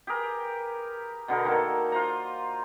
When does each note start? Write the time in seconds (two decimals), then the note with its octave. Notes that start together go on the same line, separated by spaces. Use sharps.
0.07 G4 G#4 A#4 B4
1.28 B2 D3 B3 A#4
1.45 D#3 A#3 A4
1.92 F4 C5 F#5 A#5